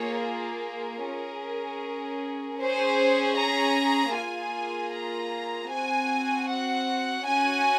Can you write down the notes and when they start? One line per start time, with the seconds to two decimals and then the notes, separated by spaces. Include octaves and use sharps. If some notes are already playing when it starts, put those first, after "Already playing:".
Already playing: A#3 F4 G#4 C#5
0.25 A#4
1.04 C#4 G#4
2.60 C#4 G#4 C5
3.38 A#5
4.16 A#3 F4 G#4 G#5
4.95 A#5
5.73 C4 F#4 G#5
6.51 F#5
7.29 C#4 F#4 G#5